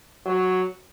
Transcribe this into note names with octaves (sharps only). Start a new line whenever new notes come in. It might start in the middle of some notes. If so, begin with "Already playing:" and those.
F#3